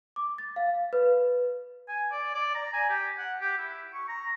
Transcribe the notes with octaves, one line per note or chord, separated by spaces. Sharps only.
D6
A6
F5
B4
G#5
D5
D5
A#5
G#5
G4
F#5
G4
E4
C#6
A#5